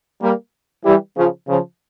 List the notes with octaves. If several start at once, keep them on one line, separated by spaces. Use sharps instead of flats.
G3 A#3
E3 G3
C#3 F3
C#3 F3